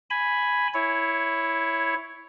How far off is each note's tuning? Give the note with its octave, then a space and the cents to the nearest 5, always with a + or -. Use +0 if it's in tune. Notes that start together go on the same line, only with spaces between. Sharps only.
G#5 +0 B5 +0
E4 +0 C#5 +0